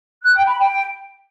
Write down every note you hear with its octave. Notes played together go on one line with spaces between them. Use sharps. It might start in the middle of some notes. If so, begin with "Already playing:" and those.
F#6
G5
B5
G5